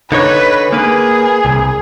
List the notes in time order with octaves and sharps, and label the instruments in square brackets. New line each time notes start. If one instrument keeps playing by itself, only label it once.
[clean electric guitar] D3 D#4 C#5 [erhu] B4
[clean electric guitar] A#3 B4 [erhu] G#4
[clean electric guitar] C2